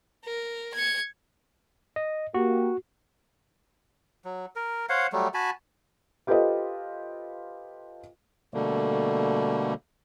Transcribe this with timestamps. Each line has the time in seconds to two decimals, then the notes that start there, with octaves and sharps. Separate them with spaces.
0.25 A#4
0.74 G#6 C#7
1.96 D#5
2.34 A#3 F#4 G4
4.25 F#3
4.56 A#4
4.89 C5 C#5 F5 F#5
5.13 F#3 G3 A3
5.34 F#4 G#5 A5 B5
6.27 F4 G4 A4 B4 C5 D#5
8.54 B2 D3 G3 A3 A#3